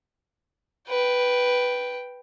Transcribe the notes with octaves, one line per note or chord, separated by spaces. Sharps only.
B4 G5